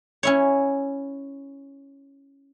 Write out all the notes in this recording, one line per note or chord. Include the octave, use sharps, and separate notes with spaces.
C#4 E4 C#5